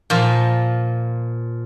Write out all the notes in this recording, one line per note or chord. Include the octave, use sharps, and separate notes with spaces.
A#2 F3